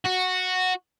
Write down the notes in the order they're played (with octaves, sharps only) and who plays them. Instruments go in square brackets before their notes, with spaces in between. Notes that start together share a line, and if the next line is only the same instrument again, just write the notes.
[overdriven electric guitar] F#4